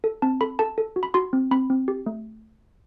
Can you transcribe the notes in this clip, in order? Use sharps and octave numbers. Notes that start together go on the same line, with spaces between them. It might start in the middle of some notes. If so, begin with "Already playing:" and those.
A4
C4 A5
A4 B5
A4 A5
A4
F#4
B5
F#4 C6
C4
C4 B5
C4
G4
A3